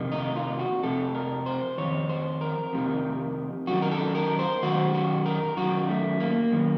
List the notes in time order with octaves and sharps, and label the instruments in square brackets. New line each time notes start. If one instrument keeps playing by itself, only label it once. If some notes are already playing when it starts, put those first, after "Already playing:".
Already playing: [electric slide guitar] F2 C3 D#3
D#4
F4
F#4
F2 C3 A4
A#4
C5
F2 C3 D#3 C#5
C5
A#4
F2 C3 D#3
F#2 D#3 F#4
A#4
A4
A#4
C5
F#2 D#3 F#4
F#4
A#4
F#2 D#3 F#4
A3
A#3
F#2 D#3